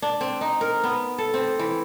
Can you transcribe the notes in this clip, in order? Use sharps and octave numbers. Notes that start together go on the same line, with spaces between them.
D4
C4
D#4
A#4
B3
A4
C4
E3